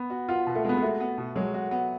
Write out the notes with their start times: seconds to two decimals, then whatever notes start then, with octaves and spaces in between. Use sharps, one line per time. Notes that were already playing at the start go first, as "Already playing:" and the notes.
Already playing: B3
0.10 F#4
0.29 B3 F4
0.47 B2
0.55 A3
0.65 G#3 B3
0.78 B3
0.82 A3 F#4
1.00 B3
1.18 B2
1.36 F#3 G#3
1.54 F#4
1.71 B3